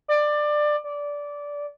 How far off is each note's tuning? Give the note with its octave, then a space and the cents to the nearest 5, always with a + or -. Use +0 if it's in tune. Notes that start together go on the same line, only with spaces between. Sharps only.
D5 +20
D5 -15